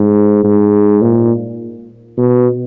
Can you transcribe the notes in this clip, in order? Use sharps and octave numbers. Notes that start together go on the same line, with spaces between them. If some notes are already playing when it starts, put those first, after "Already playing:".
Already playing: G#2
G#2
A#2
B2